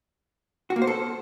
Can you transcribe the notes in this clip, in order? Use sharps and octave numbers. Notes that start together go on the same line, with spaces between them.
F#4
A#3
C5
A4